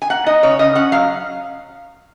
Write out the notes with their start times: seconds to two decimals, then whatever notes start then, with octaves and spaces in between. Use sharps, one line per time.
0.02 G#5
0.10 A#3 F#5
0.26 D#4 D#5
0.43 C#3 C#5
0.59 C#3 D#5
0.75 C#4 F#5
0.92 F#3 F5